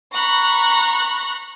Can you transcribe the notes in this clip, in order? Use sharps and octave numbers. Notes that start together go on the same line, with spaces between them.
A#5 B5 C#6 F#6 A#6